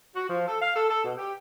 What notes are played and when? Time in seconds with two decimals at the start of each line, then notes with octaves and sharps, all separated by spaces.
0.14 F#4
0.29 F3
0.46 A4
0.60 F5
0.75 A4
0.88 A4
1.05 B2
1.17 G4